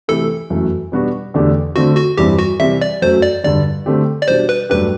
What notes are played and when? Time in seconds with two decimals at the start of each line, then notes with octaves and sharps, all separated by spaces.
0.08 C3 E3 A3 E4 G4 A4
0.50 F#2 E3 A3
0.92 B2 G3 B3 D4 F#4
1.34 E2 D3 A3 D4 G4
1.76 D3 A3 C4 F#4
1.97 F#4
2.18 G2 E3 G3 C4 E4 G4
2.39 F#4
2.60 C3 E3 G3 E5
2.81 D5
3.02 F#2 F#3 A3 C5
3.22 D5
3.44 G2 D3 G3 D5
3.86 D3 A3 C4 G4
4.22 D5
4.28 B2 G3 D4 C5
4.49 B4
4.70 G2 F#3 A3 D4 G4 B4